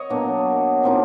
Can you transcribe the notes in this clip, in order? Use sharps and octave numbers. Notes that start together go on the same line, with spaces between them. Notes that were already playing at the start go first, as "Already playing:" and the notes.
Already playing: C#5 D#5
B2 F#3 A#3 D4
C3 F3 A#3 D#4